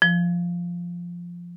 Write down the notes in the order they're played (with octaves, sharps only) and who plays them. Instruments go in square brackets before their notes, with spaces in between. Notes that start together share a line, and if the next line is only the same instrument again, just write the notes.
[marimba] F3